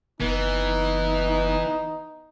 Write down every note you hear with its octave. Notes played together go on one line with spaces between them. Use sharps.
F#1 E3 B3 D#4